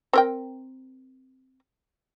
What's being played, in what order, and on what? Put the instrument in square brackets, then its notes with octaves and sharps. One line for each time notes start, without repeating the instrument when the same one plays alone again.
[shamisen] C4 A#4 G5